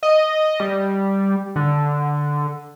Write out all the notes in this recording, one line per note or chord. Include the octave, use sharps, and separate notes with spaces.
D#5
G3
D3